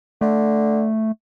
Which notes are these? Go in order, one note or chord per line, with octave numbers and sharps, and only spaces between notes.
D3 A3